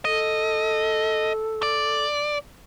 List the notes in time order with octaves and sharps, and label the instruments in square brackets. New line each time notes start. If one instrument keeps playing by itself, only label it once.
[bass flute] A4 [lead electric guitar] D#5
[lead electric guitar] D5